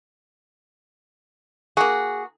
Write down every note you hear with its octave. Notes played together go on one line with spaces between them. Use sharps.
A#3 F#4 G#4